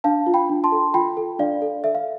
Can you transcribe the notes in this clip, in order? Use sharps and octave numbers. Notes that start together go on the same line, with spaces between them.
D4 F5 A5
F4
G5 B5
D4
A5 C6
A4
F4 G5 B5
A4
D4 D5 F5
A4
A4 E5
F5